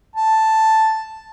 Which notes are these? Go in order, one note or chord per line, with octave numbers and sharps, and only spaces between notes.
A5